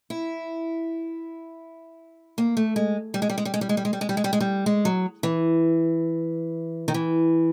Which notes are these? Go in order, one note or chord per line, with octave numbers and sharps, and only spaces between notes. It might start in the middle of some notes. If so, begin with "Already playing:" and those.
E4
A#3
A3
G#3
G3
G#3
G3
G#3
G3
G#3
G3
G#3
G3
G#3
G3
G#3
G3
G#3
G3
G#3
G3
G#3
F#3
E3
D#3
E3